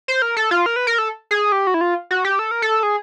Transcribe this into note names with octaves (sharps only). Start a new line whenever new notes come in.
C5
A#4
A4
F4
A#4
B4
A#4
A4
G#4
G4
F#4
E4
F4
F#4
G4
A4
A#4
A4
G#4